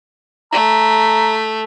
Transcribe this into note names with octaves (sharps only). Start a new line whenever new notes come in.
A3 A#5